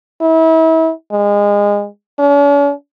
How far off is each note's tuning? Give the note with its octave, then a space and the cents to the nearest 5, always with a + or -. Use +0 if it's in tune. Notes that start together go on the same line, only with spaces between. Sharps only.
E4 -35
G#3 -25
C#4 +45